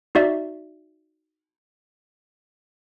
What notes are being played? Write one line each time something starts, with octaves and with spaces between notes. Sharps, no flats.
D#4 F#4 D5 E5